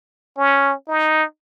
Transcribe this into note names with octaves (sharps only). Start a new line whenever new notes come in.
C#4
D#4